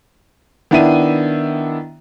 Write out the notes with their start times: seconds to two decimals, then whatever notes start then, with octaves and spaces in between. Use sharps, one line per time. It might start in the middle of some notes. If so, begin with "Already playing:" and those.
0.71 D#3 B3 D4 E4 E5 D#7